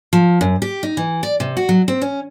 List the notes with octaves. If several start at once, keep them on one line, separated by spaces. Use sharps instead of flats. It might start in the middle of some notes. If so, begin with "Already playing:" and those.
F3
F#2
G4
D#4
E3
D5
C3
F#4
F#3
C4
C#4